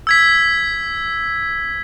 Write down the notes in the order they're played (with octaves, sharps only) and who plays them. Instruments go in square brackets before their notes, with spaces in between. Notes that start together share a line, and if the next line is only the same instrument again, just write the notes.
[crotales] E6 G#6 B6